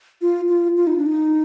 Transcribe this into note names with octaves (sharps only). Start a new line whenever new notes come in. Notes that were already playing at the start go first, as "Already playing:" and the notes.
F4
F4
F4
D#4
D4
D#4